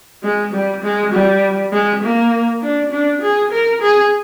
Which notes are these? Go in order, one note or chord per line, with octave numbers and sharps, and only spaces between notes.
G#3
G3
G#3
G3
G#3
A#3
D4
D4
G#4
A#4
G#4